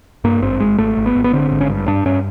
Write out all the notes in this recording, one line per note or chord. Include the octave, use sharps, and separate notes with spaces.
G2 A#3
G#1 C4
G#1 G#3
G#1 A3
G#1
B3
G#1
B3
D3 C4
G#1
C#4
G2
G2 D4
G2 C#4